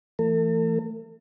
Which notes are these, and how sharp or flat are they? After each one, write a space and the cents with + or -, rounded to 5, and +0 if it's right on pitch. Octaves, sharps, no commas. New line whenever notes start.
E3 +20 A3 +25 A4 +45